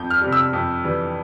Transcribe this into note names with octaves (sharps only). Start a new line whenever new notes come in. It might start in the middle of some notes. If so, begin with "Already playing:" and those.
Already playing: F2 G6
F6
C3 G3
E6
F2
E3 G3